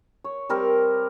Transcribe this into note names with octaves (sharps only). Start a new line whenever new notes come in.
C#5
G3 C4 A#4